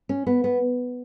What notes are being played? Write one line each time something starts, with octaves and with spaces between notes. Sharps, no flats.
C#4
B3
B3